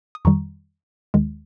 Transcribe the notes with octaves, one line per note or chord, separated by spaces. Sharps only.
D#6
F2 D#3 G3 A#5 C#6
D#2 D#3 G#3